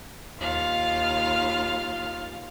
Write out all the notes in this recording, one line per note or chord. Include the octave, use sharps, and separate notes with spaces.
D#2 F4 F5